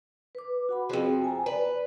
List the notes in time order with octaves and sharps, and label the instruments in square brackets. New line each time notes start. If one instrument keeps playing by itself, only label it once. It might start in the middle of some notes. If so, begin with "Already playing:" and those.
[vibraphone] B4 D6
F#4 F#5 B5
[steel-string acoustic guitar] F2 F3 [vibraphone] C4 F#4 G#4
[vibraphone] G#5 A#5
[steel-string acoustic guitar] B4 [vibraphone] D5